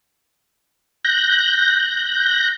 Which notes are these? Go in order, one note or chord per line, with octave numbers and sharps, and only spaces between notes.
F#6 G6 A#6